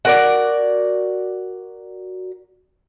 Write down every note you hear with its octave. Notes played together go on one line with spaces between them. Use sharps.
F#4 A#4 D5